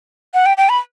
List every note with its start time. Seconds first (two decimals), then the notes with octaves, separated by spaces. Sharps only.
0.34 F#5
0.46 G5
0.57 G5
0.69 B5